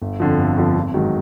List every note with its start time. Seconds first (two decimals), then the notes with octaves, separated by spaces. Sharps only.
0.02 G1
0.20 F2 D3 F3
0.38 G1
0.57 F2 D3 F3
0.75 G#1
0.94 G#2 D#3 F#3